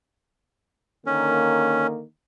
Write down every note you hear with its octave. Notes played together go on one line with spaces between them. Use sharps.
D3 D#3 A#3 C#4